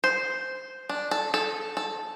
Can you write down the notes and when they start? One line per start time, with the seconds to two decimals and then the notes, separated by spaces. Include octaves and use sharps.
0.04 C5
0.89 D4
1.11 A4
1.34 A4
1.77 A4